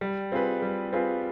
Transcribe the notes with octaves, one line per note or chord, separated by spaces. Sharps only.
G3
C4 F4 G#4 B4
G3
C4 F4 G#4 B4